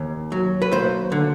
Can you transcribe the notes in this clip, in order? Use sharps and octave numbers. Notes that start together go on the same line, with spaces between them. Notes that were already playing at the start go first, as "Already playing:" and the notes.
Already playing: D#2
F#3
B4
D#2 C5
D3